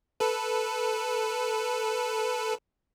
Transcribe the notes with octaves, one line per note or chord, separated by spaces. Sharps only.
A4 B4